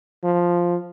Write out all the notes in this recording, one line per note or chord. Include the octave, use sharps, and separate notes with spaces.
F3